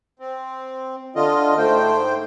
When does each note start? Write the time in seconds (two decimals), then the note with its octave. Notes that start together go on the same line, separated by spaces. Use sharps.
0.19 C4
1.16 D3 F4 D#5
1.58 G#2 A3 C5 G5